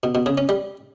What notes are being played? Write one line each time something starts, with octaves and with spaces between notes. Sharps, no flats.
B2
B2
C#3
C#4
G3